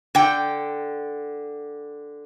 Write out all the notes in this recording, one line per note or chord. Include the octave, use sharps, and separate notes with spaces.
D3 G5